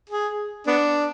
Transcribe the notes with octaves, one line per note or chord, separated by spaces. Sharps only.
G#4
B3 D4